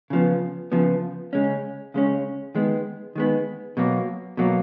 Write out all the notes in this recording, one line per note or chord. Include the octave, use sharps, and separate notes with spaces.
C#3 F3 B3
C#3 F3 B3
C#3 G#3 C#4
C#3 G#3 C#4
D#3 G#3 B3
D#3 G#3 B3
B2 F#3 A#3
B2 F#3 A#3